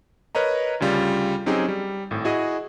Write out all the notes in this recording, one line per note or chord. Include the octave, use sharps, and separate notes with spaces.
A#4 B4 C#5 D#5 A#5
D2 C#3 G3 F4
F#3 C4 C#4 D#4 G4 G#4
G3
G#1 A2
E4 F#4 G#4 D#5